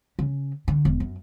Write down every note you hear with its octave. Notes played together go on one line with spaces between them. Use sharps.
C#3
D3
E1
F#2